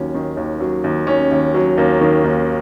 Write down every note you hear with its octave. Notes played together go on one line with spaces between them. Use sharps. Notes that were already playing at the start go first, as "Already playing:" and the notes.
Already playing: D#2 F#3 C#4
D#3
D#2
F#3
D#2
D#3 C#4
D#2
F#3
D#2 A#3
D#3
D#2